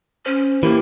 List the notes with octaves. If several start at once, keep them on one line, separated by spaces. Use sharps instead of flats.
C#4 C5
E3 A#3 E4 G4 A#4